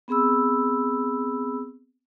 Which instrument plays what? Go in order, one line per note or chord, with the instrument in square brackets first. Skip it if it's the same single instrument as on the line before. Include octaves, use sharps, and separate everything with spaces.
[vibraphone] B3 C4 G#4 B5 E6